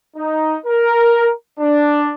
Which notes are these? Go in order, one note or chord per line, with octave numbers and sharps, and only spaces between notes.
D#4
A#4
D4